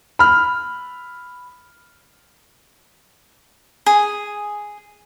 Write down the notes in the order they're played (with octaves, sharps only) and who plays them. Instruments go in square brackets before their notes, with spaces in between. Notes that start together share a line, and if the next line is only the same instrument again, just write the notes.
[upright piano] B5 F6
[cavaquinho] G#4